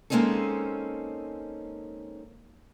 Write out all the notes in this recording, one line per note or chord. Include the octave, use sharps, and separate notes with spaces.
G#3 A#3 C4 C#4 D#4 A4